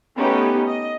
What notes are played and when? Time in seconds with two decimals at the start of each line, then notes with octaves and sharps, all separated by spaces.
0.17 A3 B3 C#4 D#4 G4 B4
0.64 D#5